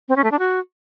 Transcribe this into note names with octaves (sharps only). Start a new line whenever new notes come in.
C4
C#4
A3
D4
F#4